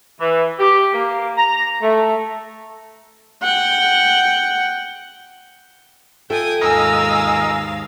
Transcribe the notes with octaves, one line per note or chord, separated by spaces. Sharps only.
E3
G4
A#3
A#5
A3
F#5 G5
F4 A4 E5 G5 G#5 D#6
D#2 G#2 A#4 D#5 F5 G#5 E6